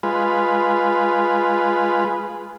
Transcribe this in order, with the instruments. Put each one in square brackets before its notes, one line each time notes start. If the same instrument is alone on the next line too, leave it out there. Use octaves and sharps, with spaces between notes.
[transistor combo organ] G#3 F4 B4